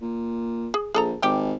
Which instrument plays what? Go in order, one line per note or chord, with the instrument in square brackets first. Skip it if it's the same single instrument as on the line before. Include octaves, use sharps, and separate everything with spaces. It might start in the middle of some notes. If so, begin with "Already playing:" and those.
[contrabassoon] A#2
[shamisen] G#4
[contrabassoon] A#1 [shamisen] G#4 A4 A#5
[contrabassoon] G#1 [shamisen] G3 G4